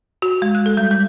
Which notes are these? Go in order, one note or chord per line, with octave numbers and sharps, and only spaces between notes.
F#4
G#3
F#6
A4
G3
G3